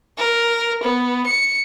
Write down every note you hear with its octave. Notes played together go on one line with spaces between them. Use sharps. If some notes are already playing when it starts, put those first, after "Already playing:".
A#4
B3
C#7